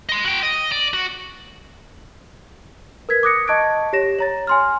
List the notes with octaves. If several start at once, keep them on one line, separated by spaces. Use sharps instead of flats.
D#5 C6
F#4 G5
D#5
D5
F#4
A#4 B4 G#6 B6
D6 D#6 F#6 A#6 C#7
D#5 A5 C#6 F#6 G#6 D7
G4 C#5 A#6 E7
C#5 A#5 A6
G#5 C6 F6